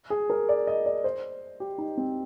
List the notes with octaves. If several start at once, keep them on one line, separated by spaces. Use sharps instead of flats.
G#4
A#4
D5
D#5
D5
C5
G4
D#4
C4